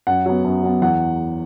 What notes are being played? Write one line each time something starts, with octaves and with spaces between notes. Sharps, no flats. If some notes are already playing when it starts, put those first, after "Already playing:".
F#2 F#5
F#3 B3
F#2
F#3 B3
E2 F#5